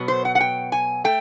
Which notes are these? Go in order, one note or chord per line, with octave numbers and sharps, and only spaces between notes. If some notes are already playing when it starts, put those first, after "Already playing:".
Already playing: B2 F#3 B3
C5
F#5
F#5
G5
G#5
A3 G5